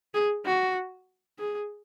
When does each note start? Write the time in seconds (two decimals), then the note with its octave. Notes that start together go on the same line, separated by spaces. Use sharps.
0.14 G#4
0.45 F#4
1.39 G#4